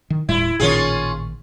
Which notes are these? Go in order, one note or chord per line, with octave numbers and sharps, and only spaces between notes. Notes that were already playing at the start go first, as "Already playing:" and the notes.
D#3
D#1 A2 G3 E4
A1 A#2 D#3 C#4 F4 G#4